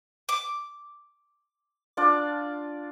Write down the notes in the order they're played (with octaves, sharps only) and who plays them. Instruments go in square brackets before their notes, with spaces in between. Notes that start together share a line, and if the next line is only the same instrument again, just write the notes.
[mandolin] D6
[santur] D4 F4 D5